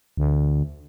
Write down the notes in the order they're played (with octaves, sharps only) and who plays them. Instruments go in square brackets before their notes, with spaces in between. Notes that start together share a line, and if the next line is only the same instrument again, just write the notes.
[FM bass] D2